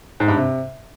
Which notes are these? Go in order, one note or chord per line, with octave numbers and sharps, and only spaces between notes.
G#2
G2
C3